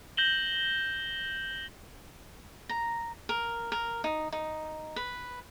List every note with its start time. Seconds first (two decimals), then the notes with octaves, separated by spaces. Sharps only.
0.17 G6 A#6 E7 F#7 G7
2.69 A#5
3.29 A#4
3.72 A#4
4.04 D#4
4.33 D#4
4.96 B4